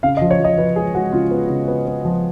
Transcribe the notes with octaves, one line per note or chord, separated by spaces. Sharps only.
C#3 F5
D#5
F3
C#5
F3 D#5
F3 B4
G#3 G#4
G#3 F#4
C#3 F4
B3
C#3
B3
B3
F3